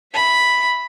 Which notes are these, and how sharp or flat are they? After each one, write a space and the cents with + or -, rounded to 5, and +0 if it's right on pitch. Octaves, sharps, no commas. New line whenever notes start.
E5 +0 B5 +0